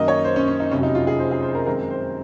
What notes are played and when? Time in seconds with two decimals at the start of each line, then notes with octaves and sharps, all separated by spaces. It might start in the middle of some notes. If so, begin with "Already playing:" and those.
Already playing: F#2 D#3 A#3 D#5
0.08 C#5
0.24 C5
0.36 C#4
0.48 C#4
0.60 D#4
0.71 F1 F2 C3 F#3 C#4
0.83 D#4
0.95 F4
1.07 G#4
1.19 C5
1.31 G#4
1.43 C5
1.55 A#4
1.66 F#2 D#3 G#3 C4 A#4
1.90 C5